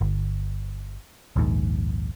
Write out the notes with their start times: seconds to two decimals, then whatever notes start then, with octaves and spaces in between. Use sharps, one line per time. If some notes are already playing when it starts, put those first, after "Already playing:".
0.01 G1
1.36 A#1 D#2 G#2